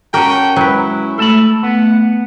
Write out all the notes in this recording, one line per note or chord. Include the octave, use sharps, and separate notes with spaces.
C#4 F#4 A#4 G5 A5
F#3 G#3 E4 B4
A3 A4 A5 B5
B3 F#5